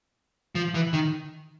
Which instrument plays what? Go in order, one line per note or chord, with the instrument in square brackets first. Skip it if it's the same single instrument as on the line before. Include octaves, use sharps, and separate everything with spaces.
[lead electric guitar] F3
E3
D#3